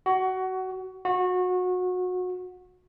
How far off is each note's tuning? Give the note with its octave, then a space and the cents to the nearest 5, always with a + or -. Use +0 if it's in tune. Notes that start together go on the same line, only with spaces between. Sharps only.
F#4 +20
F#4 -25